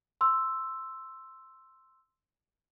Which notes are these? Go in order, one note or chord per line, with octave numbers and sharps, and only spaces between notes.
C6 E6